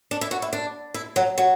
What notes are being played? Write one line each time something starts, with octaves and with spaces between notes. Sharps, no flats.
D4
E4
F#4
E4
D4
E4
F#3
F#3